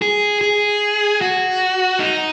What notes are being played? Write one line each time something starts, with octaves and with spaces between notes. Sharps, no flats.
G#4
G#4
F#4
D#4